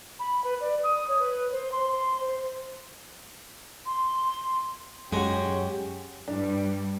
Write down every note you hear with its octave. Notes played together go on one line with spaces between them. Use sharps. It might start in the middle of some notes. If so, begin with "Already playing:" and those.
B5
B4
D5
D#6
C#5
B4
C5
C6
C6
C5
C6
F#2 G#3 C#4 F#4 G4
G2 G3 D4